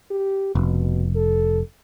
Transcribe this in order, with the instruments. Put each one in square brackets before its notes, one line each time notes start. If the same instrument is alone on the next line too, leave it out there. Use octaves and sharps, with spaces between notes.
[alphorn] G4
[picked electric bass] F1 [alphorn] B2
[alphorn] A4